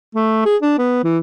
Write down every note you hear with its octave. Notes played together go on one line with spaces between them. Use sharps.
A3
G#4
D4
B3
E3